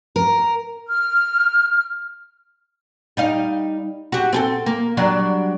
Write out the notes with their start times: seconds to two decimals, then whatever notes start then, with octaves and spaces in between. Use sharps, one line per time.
0.16 A#4
0.87 F6
3.17 G3 D#4 F5
4.12 F#4 G4
4.33 C4 G#4 A4
4.66 A#3
4.97 F#3 G3 D4